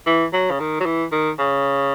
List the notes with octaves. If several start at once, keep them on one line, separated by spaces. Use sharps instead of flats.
E3
F#3
C#3
D#3
F#3
E3
D#3
C#3